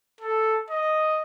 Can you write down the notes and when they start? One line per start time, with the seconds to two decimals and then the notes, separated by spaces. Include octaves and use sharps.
0.21 A4
0.70 D#5